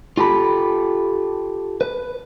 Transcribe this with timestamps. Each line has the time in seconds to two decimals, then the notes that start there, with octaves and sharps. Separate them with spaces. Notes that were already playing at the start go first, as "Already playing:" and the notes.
0.17 F4 G4 A4 B5
1.81 B4